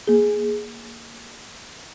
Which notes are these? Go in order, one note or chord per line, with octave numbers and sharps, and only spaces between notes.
A#3 G#4